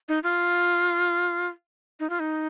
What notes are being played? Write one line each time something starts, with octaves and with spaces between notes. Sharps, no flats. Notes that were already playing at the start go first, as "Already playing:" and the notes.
D#4
F4
D#4
F4
D#4